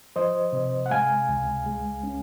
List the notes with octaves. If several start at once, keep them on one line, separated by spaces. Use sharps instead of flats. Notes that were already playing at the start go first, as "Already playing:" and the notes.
F3 C5 D#5
C3
F#5
G#3 F5 G#5
C#2
G#3
C#4